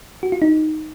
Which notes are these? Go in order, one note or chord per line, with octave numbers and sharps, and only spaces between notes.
F#4
F4
D#4